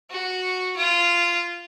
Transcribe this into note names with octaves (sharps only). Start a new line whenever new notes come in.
F#4
F4